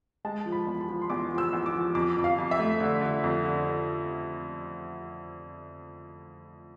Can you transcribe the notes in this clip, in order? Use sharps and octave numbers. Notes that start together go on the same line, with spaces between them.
G#3 A5
F3
B5
E2
B5
F3
C6
E2 D6
F3
E6
E2
D6
F3
F2 D6
F2
F5
F2
E5
A3
D3
D3
F2
D3